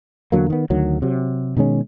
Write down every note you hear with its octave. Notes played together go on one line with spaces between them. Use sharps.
E2 D3 F#3 A#3
D#3 B3
D2 D#3 F#3
C3 F#3
B2 D#3 G#3 C#4